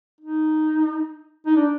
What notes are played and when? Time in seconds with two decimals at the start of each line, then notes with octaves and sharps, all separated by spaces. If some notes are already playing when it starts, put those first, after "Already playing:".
0.21 D#4
1.46 D#4
1.56 D4